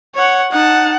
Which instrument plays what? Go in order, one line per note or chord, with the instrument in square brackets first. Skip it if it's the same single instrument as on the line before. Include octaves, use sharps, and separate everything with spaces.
[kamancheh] C#5 F#5
[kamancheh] D#4 A5 [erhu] F#5